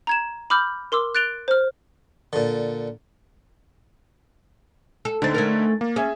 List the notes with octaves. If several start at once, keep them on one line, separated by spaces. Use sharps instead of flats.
A#5 G#6 E7
B5 D6 E6 F6 G6
A#4 C6 D6 E6
F#6 A6 D7 F7 G7
C5 F6
A#2 D3
A4
D2 D3 C4 D#4 A6
A3 C#4 A#4
A#3
C#4 G#4 E5